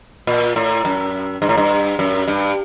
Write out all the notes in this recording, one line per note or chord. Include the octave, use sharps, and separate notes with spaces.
A#2
A2
F#2
G2
A2
G2
F#2
G2